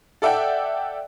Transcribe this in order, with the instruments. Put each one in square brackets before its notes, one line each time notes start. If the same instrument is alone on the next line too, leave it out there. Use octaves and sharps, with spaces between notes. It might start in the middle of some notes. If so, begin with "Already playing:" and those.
[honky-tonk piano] A4 D5 E5 F#5 G5